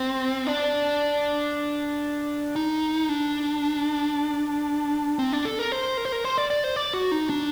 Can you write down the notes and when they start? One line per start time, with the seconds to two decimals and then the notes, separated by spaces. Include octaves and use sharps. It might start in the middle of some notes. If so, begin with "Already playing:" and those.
Already playing: C4
0.47 D4
2.56 D#4
3.09 D4
5.19 C4
5.32 D4
5.45 A4
5.59 A#4
5.72 C5
5.97 A#4
6.05 C5
6.12 A#4
6.24 C5
6.38 D5
6.50 D5
6.64 C5
6.76 D5
6.94 F#4
7.12 D#4
7.30 D4